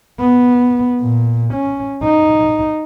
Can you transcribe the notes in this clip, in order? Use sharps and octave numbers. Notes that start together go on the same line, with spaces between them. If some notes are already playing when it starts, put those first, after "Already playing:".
B3
A#2
C#4
D#4